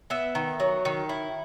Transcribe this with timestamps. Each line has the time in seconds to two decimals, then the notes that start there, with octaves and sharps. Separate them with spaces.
0.10 B3 E5
0.35 D#3
0.60 F#3
0.85 D#3
1.09 E4